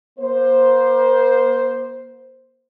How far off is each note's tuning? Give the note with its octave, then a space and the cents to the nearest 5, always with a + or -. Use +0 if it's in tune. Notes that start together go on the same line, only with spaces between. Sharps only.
A#3 +35 C5 +0